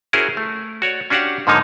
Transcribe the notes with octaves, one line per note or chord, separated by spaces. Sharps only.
C#4 E4 F#4 G#4 A#4 C5
A3
F#4 C#5 D5
C#4 D4 F#4 G4 F5 F#5
G#2 D3 F3 A#3 D#4 C#5